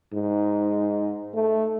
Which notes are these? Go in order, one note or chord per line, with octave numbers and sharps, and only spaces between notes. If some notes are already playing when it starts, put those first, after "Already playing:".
G#2
A3